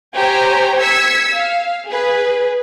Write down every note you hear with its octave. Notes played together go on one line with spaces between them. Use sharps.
G4 C5 C#5 G5 G#5 A#5
E6 G#6 B6 C#7
F5
G#4 B4